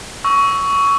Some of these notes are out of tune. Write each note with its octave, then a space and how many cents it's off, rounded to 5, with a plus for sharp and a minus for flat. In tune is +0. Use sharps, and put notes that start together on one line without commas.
C#6 +15 E6 +0